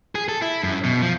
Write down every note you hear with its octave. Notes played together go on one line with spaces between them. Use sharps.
G#4
A4
E4
F#2
B2
F3